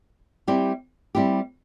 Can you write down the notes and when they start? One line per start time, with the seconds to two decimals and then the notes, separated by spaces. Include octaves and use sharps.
0.48 G3 C4 E4 G4
1.15 G3 C4 E4 G4